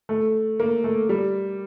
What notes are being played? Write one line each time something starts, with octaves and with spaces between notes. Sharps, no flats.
A3
A#3
A3
G3